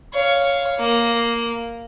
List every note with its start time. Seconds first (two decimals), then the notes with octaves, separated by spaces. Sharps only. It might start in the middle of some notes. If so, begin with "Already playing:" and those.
0.13 C#5 F5
0.79 A#3